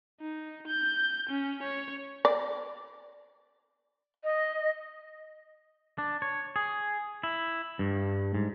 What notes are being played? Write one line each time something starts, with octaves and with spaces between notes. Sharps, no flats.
D#4
G6
C#4
C#5
D5
D#5
D4
C#5
G#4
E4
G2
G#2